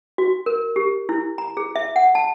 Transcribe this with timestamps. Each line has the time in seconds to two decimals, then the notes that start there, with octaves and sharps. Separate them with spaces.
0.18 F#4
0.46 A#4
0.76 G4
1.09 E4
1.38 A#5
1.57 G#4
1.76 E5
1.96 F#5
2.15 A5